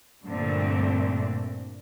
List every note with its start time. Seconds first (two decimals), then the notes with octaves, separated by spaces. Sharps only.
0.25 G2 A#2 D3 A3 C4